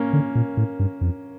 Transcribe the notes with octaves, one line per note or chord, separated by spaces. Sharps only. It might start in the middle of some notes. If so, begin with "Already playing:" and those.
Already playing: A#3 C#4
D3
A#2
A2
G2
F2